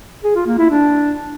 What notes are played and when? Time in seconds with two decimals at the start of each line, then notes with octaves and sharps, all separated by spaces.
0.24 G#4
0.35 F4
0.47 A#3
0.58 E4
0.70 D4